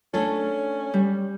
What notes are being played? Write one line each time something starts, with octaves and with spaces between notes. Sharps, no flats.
A3 C#4 D4 A4
G3